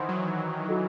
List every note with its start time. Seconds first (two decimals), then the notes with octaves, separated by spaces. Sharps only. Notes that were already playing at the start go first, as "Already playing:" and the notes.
Already playing: D#3 E3 C5 F#5 C6
0.09 F#3
0.68 F#4 A4 D#5